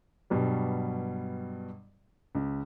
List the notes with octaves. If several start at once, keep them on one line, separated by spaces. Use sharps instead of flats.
G2 B2 F#3 G3
C#2